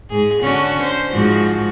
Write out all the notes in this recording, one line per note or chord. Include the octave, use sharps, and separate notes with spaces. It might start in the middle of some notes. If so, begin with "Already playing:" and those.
G#2 G#4
D3 C#4 F#4
C5
G#2 F3 F#4